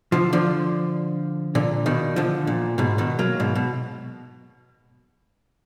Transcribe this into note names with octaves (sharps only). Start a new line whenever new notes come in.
D3 F3
D3 F3
A#2 D3
B2 D#3
D3 F3
A#2
G#2 B2
B2 D#3
F#3 A#3
G#2 B2
B2